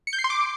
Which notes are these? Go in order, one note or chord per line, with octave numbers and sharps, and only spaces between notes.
C#7
G6
C7
C6
D6